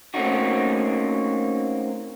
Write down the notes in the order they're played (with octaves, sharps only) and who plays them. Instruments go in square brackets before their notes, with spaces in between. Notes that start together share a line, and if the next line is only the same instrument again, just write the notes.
[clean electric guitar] A3 A#3 C4 C#4 D#4 F#4